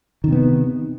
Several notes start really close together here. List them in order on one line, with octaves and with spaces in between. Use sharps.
D#3 C3 B3